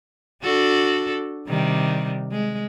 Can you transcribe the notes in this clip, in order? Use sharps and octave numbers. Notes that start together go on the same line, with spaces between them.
D4 F#4 A4
C3 D#3 G3
G#3